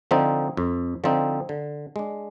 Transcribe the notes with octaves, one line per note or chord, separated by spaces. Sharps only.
D3 F3 C4 D#4
F2
D3 F3 C4 D#4
D3
G#3 D4